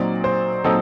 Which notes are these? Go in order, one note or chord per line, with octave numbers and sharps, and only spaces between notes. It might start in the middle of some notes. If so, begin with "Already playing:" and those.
Already playing: A#2 F#3 C4 D#4 D5
C5
A#2 F#3 C4 D#4 A4